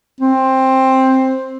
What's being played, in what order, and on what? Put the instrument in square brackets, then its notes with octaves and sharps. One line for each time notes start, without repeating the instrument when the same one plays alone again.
[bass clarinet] C4